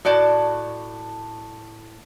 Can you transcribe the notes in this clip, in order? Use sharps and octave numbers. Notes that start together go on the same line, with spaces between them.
A2 F#4 D5 A5